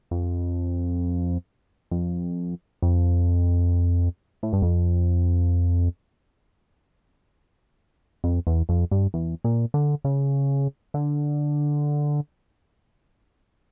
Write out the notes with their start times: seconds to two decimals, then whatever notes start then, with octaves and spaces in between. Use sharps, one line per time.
0.11 F2
1.91 F2
2.82 F2
4.43 A2
4.53 G2
4.62 F2
8.24 F2
8.47 E2
8.69 F2
8.91 G2
9.14 E2
9.44 A#2
9.74 D3
10.05 C#3
10.94 D3